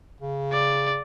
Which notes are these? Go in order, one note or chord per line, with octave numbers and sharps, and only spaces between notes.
C#3
D5